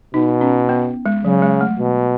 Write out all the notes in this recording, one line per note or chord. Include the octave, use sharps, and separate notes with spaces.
B2 D#4
C#4
B3
G#3
C#3 F#3
G#3
A3
B2